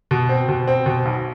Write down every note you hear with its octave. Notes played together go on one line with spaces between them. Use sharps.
B2
C4
B2
C4
B2
B1